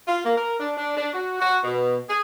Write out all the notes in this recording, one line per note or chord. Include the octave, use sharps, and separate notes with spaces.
F4
A#3
A#4
D4
D4
D4
F#4
F#4
B2
G#4